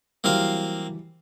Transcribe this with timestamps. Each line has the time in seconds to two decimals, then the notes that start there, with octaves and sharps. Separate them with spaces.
0.24 E3 F#3 G3 A#3 C4 F5